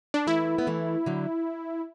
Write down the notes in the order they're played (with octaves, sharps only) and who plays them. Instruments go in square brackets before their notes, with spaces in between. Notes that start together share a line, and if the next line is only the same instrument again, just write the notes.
[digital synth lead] D4
[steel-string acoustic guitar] E3 A3 [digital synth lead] E4
[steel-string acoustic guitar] B3
E3 A3
D3 F#3